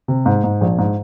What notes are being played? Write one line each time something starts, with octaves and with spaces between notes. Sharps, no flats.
C3
G#2
G#2
A#1
G#2